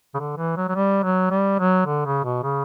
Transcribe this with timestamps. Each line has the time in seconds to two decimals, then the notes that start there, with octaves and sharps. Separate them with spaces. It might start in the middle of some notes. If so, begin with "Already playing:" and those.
0.14 C#3
0.19 D3
0.37 E3
0.57 F#3
0.69 F#3
0.75 G3
1.03 F#3
1.30 G3
1.59 F#3
1.86 D3
2.05 C#3
2.24 B2
2.43 C#3